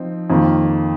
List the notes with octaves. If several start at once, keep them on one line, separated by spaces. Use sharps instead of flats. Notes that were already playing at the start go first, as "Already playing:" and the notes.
Already playing: F3 C4 D#4
F2 D#3 A#3